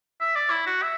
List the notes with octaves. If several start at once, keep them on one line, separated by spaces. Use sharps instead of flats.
E5
D5
E4
F#4
E5